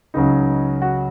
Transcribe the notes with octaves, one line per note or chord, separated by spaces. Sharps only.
C#2 C#3 F#3 D#4
F#4